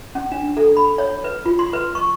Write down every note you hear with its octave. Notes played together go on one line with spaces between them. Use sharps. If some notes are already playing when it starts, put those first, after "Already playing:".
C#4
D4
A4
B5
C#5
B4
F4
C6
B4
C#6